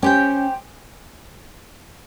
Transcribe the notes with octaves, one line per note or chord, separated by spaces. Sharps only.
C#4 G4 C5 G5